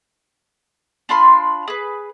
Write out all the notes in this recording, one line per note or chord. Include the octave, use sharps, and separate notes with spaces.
D4 F4 B5 C6
G#4 B4